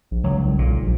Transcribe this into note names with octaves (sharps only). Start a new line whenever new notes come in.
A#1
C#2 F#3
C2
B1 A#2
A#1